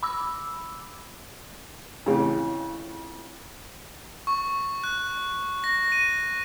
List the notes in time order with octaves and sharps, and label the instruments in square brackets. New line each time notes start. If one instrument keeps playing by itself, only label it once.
[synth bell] B5 D6 E6
[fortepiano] F2 A2 C#3 E3
[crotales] C#6
F#6
A#6
D#7